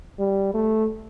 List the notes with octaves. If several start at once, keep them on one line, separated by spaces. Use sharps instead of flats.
G3
A3